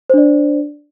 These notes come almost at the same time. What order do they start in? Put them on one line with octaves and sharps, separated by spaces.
C5 D4 D5